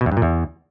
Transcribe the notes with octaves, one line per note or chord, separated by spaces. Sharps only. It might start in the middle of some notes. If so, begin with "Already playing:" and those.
B2
E2
G2
A#2
E2